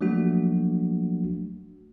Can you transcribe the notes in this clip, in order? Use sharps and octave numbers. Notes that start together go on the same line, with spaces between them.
F3 F#3 A3 A#3 D4 F#4